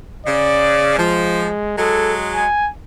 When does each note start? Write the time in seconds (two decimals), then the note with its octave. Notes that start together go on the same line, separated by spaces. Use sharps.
0.27 C#3 D5
0.98 F3 G#3
1.78 F#3 G#3 A4
2.35 G#5